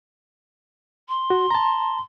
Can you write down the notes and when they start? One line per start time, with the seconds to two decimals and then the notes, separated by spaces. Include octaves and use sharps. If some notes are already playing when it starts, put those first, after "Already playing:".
1.08 C6
1.30 F#4
1.51 A5 A#5